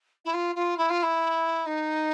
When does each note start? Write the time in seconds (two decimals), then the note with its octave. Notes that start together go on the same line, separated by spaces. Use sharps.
0.25 E4
0.33 F4
0.55 F4
0.77 E4
0.90 F4
1.02 E4
1.66 D#4